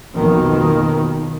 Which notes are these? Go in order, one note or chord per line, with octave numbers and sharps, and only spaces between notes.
B1 F2 B2 D#3 A#3